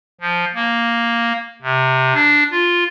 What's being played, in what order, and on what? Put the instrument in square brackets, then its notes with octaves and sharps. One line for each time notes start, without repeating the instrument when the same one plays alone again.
[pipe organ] F3
A#3
C3
D4
F4